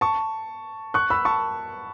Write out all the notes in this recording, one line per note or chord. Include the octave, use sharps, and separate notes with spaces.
A5 C#6
C#6 F#6
B5 E6
A5 C#6